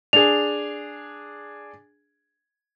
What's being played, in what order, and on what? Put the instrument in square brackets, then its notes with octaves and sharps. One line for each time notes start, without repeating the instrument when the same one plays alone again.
[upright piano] D4 G#4 [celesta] F7